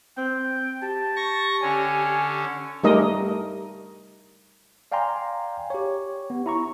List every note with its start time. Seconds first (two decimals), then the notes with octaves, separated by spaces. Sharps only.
0.17 C4 G5
0.83 G4 A5
1.16 C#6 A#6
1.62 D3 C#4 G#5
2.84 G3 A3 D#4 A#4 D#5
4.92 D5 F5 G5 G#5 A#5 C6
5.70 G4 C#5
6.30 B3
6.46 E4 A#5 C#6